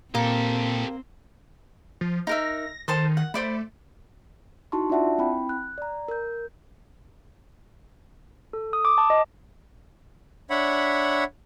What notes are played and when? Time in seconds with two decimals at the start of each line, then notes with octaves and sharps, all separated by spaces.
0.15 A#2 A#3 C4 G4 A4
2.01 F3
2.27 D#4 A#4 E5 A#6
2.88 D#3 A4 C5 A5
3.17 F#5
3.34 A3 C5 D5 B5
4.72 D#4 E4 F#4 A5 C6 C#6
4.90 D4 F4 D5 E5 F#5 A5
5.18 C4 E4 G5 B5
5.49 F#6
5.78 D5 A#5
6.08 A#4 G6
8.53 A4
8.73 D#6
8.85 D6
8.98 A5
9.10 D#5
10.50 D4 C#5 E5 F#5 B5